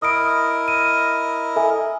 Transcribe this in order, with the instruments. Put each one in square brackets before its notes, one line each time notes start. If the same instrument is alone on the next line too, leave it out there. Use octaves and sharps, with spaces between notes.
[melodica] E4 A#4 D#5 [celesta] D#6 D7
[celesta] D#7
A4 E5 G#5